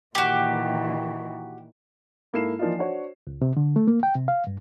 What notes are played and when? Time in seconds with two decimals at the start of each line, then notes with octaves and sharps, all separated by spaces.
0.15 A#2 D#3 E3 F#4 G4
2.33 G#2 A#3 E4 A4 C7 E7
2.59 E3 F3 A#3 D4 D#4 F4
2.78 D4 F#4 C5 C#5
3.27 C#2
3.42 C3
3.57 D3
3.76 A3
3.87 A#3
4.03 G5
4.15 C3
4.28 F5
4.47 G2